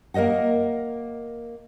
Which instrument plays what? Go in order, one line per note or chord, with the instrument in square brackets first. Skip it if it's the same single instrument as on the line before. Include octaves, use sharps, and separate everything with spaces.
[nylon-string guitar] A#3 A#4 C5 D#5 F#5